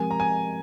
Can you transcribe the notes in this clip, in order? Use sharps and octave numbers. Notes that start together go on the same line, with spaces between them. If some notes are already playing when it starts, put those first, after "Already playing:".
Already playing: F3 G#3 C4 G4 A#4 G#5
A#5
G#5